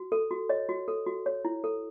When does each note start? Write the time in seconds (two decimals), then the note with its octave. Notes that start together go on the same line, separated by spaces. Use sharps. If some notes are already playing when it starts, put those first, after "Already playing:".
Already playing: F#4
0.12 A4
0.31 F#4
0.49 C#5 D#5
0.69 F#4
0.88 A4
1.07 F#4
1.26 C#5
1.45 E4
1.64 A4